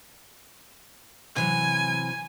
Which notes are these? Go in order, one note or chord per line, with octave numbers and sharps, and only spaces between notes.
C3 E3 F#3 G#5